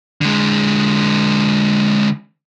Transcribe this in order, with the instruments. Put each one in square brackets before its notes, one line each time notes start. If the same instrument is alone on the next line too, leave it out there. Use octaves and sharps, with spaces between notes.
[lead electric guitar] D3 G#3